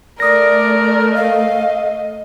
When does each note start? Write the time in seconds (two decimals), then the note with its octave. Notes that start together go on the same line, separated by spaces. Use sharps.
0.20 A3 A#4 D5 D#6 A#6
1.15 D#5 F5